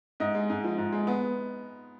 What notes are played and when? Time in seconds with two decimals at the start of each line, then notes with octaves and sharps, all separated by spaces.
0.20 G#2 D#5
0.35 G#3
0.50 G#2
0.64 F3
0.78 G#2
0.92 G#3
1.07 B3